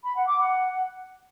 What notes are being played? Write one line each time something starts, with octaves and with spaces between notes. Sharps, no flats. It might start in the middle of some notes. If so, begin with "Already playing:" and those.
B5
F#5
D6
F#5